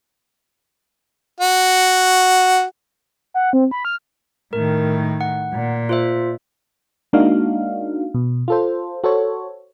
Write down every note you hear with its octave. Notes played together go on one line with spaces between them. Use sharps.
F#4
F#5
C4
B5
F6
A2 D#3 A#4
F#5
A#2
F4 C5 E5
G#3 A#3 D4 D#4 F#4 F5
B2
F4 A4 C5
F#4 A4 C5 C#5